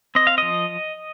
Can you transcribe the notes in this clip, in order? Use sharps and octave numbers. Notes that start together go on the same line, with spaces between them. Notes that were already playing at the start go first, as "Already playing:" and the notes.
C4 D#5
F5
F3 D#5